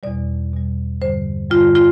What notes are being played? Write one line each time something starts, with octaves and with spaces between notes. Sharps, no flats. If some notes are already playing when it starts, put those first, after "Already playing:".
E2 B2 G3 D5
E2 B2 G3
G2 D3 G3 C5
G2 D3 G3 F4
F4